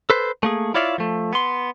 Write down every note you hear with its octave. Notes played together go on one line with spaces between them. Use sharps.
A4 B4 C5
A3 A#3 G#4
E4 F4 C#5 D5 E5 F5
F3 A3
B3 C6